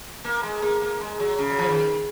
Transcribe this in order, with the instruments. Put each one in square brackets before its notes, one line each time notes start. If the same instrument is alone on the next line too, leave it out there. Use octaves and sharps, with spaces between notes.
[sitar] A#3
G#3
A#3
A#3
G#3
F#3
C#3
F#3
F3
D#3